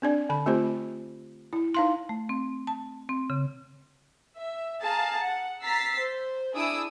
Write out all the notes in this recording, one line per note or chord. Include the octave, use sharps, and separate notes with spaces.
C4 D4 D5
D3 B5
A3 C4 F4 G4 C5
E4
D#4 F5 C6
A3
C4
A5
C4
C#3
E5
G#4 F5 A5 A#5
F#5
A#5 E6 A6 B6 C7
C5
D4 E4 G#4 D#6 E6 D7